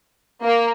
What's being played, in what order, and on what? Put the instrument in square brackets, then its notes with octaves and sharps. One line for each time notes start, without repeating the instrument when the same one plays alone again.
[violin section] A#3